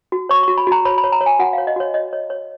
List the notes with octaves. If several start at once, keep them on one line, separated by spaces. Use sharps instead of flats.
F#4
C#5 C#6
F#4 C#6
B5
F#4 A#5
C#5 B5
B5
C#5
A#5
C#5
G#5
F#4 F#5
C#5 F5
D#5
F#4 C#5
C#5 D#5
C#5
C#5